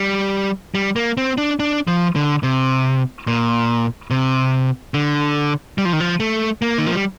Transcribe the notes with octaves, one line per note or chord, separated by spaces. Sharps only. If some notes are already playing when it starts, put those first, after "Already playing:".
Already playing: G3
G3
A#3
C4
D4
D4
F3
D3
C3
A#2
C3
D3
G3
F3
D#3
F3
A3
A#3
D#3
F3
G3